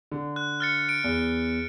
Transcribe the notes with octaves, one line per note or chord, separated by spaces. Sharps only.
D3
F#6
F6 A6 C#7
D7
E2